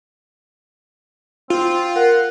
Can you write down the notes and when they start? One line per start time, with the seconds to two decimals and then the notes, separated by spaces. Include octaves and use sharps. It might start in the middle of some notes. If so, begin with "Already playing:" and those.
1.50 C4 F4
1.96 A#4 F#5